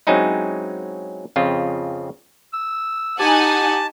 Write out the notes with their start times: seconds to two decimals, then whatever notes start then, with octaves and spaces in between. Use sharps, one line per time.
0.07 F#3 G#3 C4 C#4 D#4 E4
1.36 F2 C#3 C4 F4
2.53 E6
3.19 D#4 G4 F#5 G#5 A5